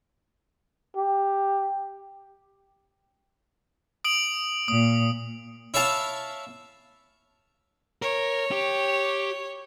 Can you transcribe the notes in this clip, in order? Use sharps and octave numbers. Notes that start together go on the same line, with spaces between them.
G4
D#6 D7 F#7
A#2 D#6
E4 C#5 E5 F5 A5
A#4 C#5
G4